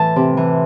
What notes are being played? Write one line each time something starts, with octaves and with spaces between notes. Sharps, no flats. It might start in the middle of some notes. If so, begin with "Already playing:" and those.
Already playing: A2 E3 A5
C3
E3